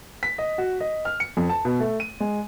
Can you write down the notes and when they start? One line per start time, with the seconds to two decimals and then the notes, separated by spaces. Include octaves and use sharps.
0.23 B6
0.38 D#5
0.58 F#4
0.80 D#5
1.05 F6
1.20 C#7
1.37 F2
1.50 A5
1.65 B2
1.80 A3
2.00 D#7
2.20 G#3